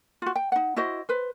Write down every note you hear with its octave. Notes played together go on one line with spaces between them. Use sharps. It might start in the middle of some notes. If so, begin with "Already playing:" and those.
F4 F#4
G5
D#4 F#5
E4 F#4 C5 D#5
B4 C5